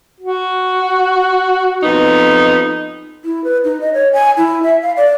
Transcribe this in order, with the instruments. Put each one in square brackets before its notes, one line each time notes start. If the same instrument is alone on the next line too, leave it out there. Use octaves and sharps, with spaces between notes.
[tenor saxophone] F#4
[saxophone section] F2 B3 D#4
[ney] E4
B4
D#4
D#5
C#5
G#5
E4
E5
F5
D5